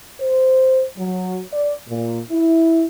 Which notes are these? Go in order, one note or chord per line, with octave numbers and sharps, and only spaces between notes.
C5
F#3
D5
A#2
E4